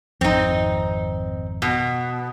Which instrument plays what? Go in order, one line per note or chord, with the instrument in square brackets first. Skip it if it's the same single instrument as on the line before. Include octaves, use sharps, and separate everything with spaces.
[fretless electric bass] G#1 F2 [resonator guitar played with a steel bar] C4 D#4
[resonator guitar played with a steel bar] B2